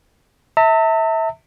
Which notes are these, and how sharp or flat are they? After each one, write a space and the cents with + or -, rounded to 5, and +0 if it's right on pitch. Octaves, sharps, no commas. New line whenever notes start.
E5 -25 A5 +45